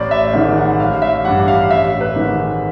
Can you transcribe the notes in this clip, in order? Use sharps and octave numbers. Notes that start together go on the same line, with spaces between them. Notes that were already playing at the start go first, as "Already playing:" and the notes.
Already playing: A1 D5
E5
G#2 D#3 E5
F#5
A1 F5
E5
G2 E3 F#5
F5
A1 E5
B4
G#2 D#3